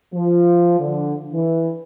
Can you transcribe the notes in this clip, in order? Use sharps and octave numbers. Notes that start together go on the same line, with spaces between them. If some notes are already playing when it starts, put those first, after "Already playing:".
F3
D3
E3